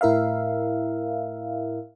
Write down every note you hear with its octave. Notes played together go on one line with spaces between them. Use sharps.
A2 E4 A#4 E5 F5